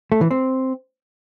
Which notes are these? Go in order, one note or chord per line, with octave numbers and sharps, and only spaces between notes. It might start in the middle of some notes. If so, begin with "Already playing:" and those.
A3
E3
C4